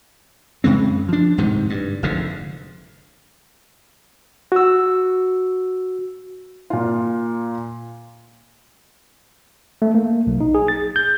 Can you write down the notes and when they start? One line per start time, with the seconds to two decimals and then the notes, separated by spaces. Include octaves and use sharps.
0.64 F#2 C#3 G#3 C4
1.09 F3 D4
1.38 D1 G#2 C3 D#3
1.70 G2
2.02 F1 F2 G#2 D3
4.52 F#4 E6
6.70 A#2 F4
9.82 A3
9.94 A#3
10.27 B1
10.41 D#4
10.54 G#4
10.68 A6
10.96 G6